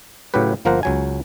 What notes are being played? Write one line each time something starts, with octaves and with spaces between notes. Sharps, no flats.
A2 C#3 F#3 G4 B4
G1 F3 A#3 A#4 C5 F#5
C#2 F#3 G#5